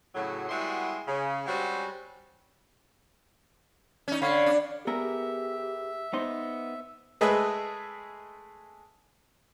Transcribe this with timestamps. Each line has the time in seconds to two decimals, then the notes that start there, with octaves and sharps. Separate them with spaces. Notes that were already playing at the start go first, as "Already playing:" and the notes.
0.15 A2 C#3 F#3
0.49 G3 G#3 B3 E4 F#4 C6
1.08 C#3
1.47 G3 G#3 C4 C#4 F#4
4.08 C#4 D#4
4.22 D3 C#5 F5 B5
4.46 D4
4.87 B3 G4 G#4 A#4 E5
6.13 B3 D#4 C5
7.21 G#3 A3 G#4 B4 D#5 E5